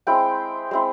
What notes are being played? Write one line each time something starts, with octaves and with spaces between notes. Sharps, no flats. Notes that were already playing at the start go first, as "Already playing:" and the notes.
G#3 C4 E4 G5
G#3 C4 E4